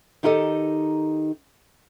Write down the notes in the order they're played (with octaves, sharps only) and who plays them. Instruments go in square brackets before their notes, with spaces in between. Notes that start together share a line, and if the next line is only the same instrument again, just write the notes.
[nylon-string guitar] D#3 D#4 E4 G4 A4 D#5